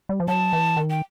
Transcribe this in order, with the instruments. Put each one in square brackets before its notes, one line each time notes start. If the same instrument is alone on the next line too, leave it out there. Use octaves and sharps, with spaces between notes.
[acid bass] G3
F3
[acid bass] F#3 [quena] A5
[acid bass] E3
D#3
[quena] G5